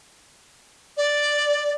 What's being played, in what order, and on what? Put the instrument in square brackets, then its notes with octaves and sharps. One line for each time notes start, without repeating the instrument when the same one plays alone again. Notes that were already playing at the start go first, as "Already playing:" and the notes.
[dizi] D5